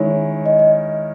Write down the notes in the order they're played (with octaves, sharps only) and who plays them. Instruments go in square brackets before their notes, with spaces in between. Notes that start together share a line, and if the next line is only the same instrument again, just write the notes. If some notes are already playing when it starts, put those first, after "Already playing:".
Already playing: [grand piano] D#3 G#3 C#4 E4 [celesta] C#5
[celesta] D#5
D#5